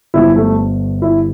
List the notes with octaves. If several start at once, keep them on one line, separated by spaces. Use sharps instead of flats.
G1 G2 D3 F3 E4
A3
E4